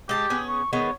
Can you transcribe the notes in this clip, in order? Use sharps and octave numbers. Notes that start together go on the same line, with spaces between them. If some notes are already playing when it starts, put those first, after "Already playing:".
G#3 G4 A5
B3 C#4 G#4
C#6
D#3 G#3 B3 C#5